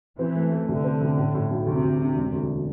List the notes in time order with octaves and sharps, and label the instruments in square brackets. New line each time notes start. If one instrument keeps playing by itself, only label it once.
[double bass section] E3 [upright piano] C4
[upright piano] A3
A3
[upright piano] C2 [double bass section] D3
[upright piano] C4
C2
A2
A2
B1
[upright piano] D2 [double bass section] C3
[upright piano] D2
D3
E1
D2